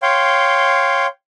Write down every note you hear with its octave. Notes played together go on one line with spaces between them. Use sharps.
C#5 F5 G5 C6